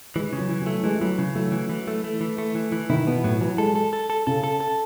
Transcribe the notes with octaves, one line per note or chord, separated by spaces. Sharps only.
E3 G#3
C#3
F#3
E3
F#3
A3
E3 G#3
E3 F#3
C#3
F#3 A3
E3
E3
A3
A3
E3
A3
E3
E3
D#3 E4
B2 B3
A2 F#3
E3 F#3
G#3 A4
A4
A4
A4
C#3 A4
A4
A4